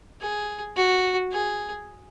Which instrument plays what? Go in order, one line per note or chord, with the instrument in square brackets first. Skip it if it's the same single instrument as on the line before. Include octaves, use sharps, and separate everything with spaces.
[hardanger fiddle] G#4
F#4
G#4